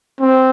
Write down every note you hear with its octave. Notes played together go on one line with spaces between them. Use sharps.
C4